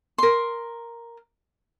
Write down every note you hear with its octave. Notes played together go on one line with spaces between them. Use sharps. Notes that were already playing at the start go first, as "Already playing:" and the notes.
A#4 C6